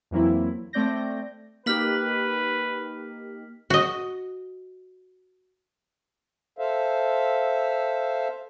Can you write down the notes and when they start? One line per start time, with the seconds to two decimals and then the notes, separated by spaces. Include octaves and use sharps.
0.11 F2 E3 F#3 A#3 C4 E4
0.73 A3 C4 D5 G6 A#6
1.66 A#3 D#4 G4 B4 F6 B6 F#7
3.70 F#4 D#5
6.59 A4 C5 E5 F5